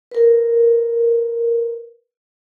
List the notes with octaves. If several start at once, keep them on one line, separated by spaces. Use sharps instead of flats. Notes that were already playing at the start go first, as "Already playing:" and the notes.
A#4 B4